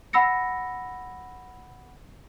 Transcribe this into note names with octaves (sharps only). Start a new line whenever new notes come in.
F#5 B5 E6 A#6 C#7